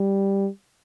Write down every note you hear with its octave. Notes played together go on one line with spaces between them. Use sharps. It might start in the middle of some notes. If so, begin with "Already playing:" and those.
Already playing: G3